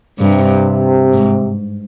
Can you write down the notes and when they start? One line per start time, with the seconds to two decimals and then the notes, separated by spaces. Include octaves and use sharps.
0.19 G2 C3
1.13 G#2